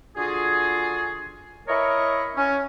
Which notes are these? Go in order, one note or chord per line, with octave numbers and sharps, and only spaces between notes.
D3 F4 F#4 G#4
E4 A#4 C#5 D#5 A#5 C#6
C#4